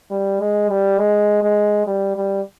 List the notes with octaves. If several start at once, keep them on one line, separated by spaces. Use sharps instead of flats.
G3
G#3
G3
G#3
G#3
G3
G3